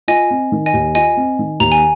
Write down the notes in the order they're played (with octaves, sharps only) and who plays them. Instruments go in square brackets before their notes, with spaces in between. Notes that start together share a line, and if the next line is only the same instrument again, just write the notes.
[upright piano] F4 [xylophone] D#5 G#5
[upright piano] C4
D#3
[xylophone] D#5 G#5
[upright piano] D#2
[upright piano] F4 [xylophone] D#5 G#5
[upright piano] C4
D#3
[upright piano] D#2 [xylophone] A#5
[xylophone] G#5